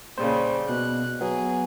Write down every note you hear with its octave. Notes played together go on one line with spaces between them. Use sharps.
A#2 C#3 G3 C5
B2 F#6
F#3 B3 G#4